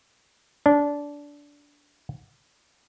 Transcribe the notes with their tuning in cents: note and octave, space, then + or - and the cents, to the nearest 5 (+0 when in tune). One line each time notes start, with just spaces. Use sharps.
D4 -20